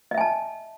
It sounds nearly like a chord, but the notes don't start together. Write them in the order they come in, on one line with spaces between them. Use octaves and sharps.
D#5 E5 G#5 A5